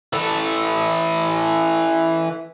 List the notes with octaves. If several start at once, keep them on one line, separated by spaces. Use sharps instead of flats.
E3 A4